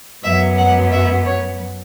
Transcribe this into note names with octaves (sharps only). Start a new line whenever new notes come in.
F#2 F#3 B3 E5
F#5
E5
C#5